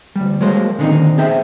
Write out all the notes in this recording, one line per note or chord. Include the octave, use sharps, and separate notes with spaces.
D2 G3
F#3 G#3 A#3 C5
A#2 D3 D#3 C4 D#4
B3 G#4 C5 E5 G5